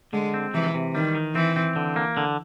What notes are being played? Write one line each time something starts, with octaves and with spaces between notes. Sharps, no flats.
D3 G#3
C4
C3 E3
C3
D#3 G3
D#3
E3 C4
C4
D3
A#3
D3